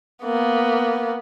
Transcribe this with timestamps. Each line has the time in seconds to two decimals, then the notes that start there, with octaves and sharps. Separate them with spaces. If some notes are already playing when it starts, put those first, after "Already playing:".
0.24 A#3 B3